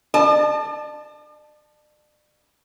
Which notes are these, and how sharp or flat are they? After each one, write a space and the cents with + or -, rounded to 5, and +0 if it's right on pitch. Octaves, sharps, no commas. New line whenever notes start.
D5 +40 A5 +0